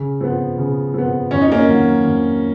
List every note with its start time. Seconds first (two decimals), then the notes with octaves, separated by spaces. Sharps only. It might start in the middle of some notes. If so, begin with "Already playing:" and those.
Already playing: C#3
0.21 F3 B3
0.58 C#3
0.94 F3 B3
1.31 F2 C#4
1.41 D#4
1.52 A#3 C#4
1.68 D#3 F#3
2.05 F2